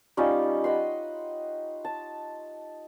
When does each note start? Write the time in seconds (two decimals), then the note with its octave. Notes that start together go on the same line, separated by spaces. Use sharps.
0.17 G3 C#4 D#4 F4
0.64 D#5 F#5 B5 C6
1.85 A5